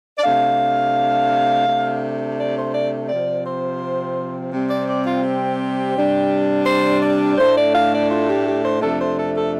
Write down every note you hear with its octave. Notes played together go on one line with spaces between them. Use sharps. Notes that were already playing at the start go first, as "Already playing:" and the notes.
D5
C3 A3 D4 F5
C3 A3 D4
D5
C5
D5
C3 F3 C4 D5
C5
C3 G3 C4
D5
D5
F4
G4
C3 G3 D4
C5
D5
A2 A3 D4 C5
D5
F5
D5
F4
G4
G4
C5
F2 C3 A3 D4 A4
C5
A4
A4